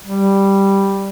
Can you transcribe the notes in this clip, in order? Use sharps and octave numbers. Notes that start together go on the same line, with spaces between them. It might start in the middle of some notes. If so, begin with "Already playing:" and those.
G3